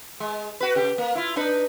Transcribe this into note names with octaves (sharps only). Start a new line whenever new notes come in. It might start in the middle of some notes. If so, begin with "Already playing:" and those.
G#3
F#4 B4
C#3 G4
A#3
E4 F4
D4 D#4 B4